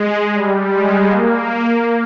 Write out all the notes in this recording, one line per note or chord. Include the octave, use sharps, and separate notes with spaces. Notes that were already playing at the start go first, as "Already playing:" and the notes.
Already playing: G#3
G3
G#3
A#3